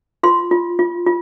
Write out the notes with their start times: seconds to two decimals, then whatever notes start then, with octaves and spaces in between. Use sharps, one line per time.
0.23 F4 C6
0.51 F4
0.79 F4
1.07 F4